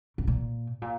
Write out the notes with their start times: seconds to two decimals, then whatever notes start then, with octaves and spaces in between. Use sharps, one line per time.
0.18 C#3
0.27 A#2
0.82 A#2